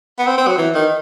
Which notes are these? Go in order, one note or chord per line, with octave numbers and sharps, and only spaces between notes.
B3
C4
C4
F#3
E3
D#3